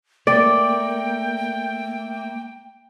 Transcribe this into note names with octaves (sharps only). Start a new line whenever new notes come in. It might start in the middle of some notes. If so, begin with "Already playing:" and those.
A3 A#3 D5 G5